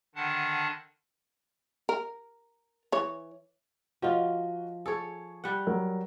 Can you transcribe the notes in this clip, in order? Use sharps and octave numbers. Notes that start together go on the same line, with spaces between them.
D3 D#3 D4 F#5 A5
A#4
E3 C#5
F3 F4 F#4 D#5
G#4 A4 C#5
G3 F#5
F#3 A#4